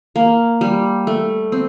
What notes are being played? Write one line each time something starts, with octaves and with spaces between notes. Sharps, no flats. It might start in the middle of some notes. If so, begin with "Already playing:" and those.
A#3
G3
A3
C4